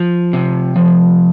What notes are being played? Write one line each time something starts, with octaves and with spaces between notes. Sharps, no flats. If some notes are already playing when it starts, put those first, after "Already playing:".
Already playing: F3
C3
F3